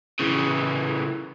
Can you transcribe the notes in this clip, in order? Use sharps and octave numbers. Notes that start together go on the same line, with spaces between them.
C#3 E3